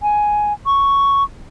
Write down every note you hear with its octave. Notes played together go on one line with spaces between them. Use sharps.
G#5
C#6